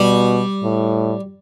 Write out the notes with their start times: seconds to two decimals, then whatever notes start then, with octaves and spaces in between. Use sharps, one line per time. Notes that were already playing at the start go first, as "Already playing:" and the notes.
Already playing: B2 G3
0.63 A2